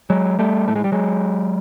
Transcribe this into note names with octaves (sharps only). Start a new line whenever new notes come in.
F#3 G#3
G3 A3
A2 A3
G#3
G3
F#3 G#3